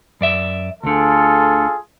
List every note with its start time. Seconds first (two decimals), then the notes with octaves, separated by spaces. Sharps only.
0.21 F#2 D5 E5
0.83 D2 D3 F4 G#4 A4